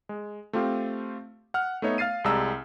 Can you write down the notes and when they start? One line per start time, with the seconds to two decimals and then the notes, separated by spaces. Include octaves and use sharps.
0.09 G#3
0.53 A3 C4 F4 G4 F5
1.54 F#5 F6
1.82 A3 B3 D#4 C#5 E5
1.98 F5 F6 A6 C7 D#7
2.24 C2 G3 G#3 A5 A#5 E6